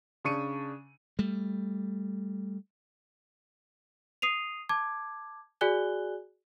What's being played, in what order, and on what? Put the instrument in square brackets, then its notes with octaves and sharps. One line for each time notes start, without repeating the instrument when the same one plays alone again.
[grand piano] C#3 D4 C#6 C#7 D#7
[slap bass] G3 A3
[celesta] D#6 C7 D#7 F7
A5 D6 G#6
F#4 G#4 D5 G#5 F#6 G7